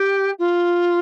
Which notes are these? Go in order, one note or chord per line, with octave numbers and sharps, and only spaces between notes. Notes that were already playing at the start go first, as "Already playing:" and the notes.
Already playing: G4
F4